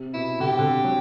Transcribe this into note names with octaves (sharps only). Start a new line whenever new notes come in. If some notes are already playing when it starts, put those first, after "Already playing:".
Already playing: C3
B2 E4
D3 G4
C3
D3
F#3